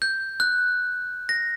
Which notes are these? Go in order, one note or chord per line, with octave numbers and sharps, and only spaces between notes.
G6
F#6
A#6